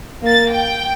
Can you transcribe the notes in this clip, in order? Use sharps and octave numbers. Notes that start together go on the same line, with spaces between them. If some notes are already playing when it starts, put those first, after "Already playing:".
A#3 A6
G5